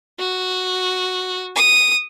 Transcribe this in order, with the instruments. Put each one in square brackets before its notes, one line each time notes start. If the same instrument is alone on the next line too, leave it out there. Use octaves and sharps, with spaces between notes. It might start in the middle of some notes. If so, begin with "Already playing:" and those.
[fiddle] F#4
D#6